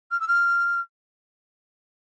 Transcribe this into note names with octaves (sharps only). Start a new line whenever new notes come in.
F6
E6
F6